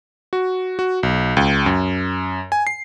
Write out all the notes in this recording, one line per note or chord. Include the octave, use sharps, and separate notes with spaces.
F#4
F#4
B1
C#2
F#2
G#5
C7